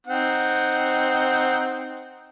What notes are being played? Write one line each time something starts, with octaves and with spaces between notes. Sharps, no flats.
C4 D#4 F#5